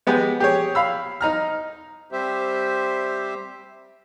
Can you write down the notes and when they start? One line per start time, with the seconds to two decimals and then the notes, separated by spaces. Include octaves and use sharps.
0.07 G#3 B3 G4 G#5
0.40 G4 G#4 C#5
0.75 F5 B5 E6
1.21 D#4 A#5 F6
2.12 G3 C4 G4 C5 E5